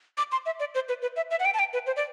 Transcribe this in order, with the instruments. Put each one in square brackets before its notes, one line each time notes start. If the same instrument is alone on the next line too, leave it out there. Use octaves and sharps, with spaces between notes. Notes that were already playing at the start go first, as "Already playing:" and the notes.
[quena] D6
C6
E5
D5
C5
B4
B4
E5
E5
F#5
G5
A5
G5
B4
C5
D5